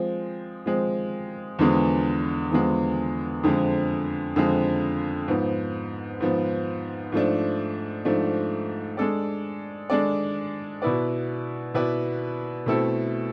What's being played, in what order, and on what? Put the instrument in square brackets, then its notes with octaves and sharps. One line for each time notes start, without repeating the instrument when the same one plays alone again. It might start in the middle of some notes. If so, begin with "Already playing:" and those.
Already playing: [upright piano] F3 G#3 C4
F3 G#3 C4
E2 D3 F3 G#3 B3
E2 D3 F3 G#3 B3
F2 D3 F3 G#3
F2 D3 F3 G#3
G#2 F3 B3
G#2 F3 B3
G#2 F3 A3 D4
G#2 F3 A3 D4
G#3 D4 A4 D5
G#3 D4 A4 D5
B2 B3 E4 B4 D5
B2 B3 E4 B4 D5
B2 A3 C4 E4 A4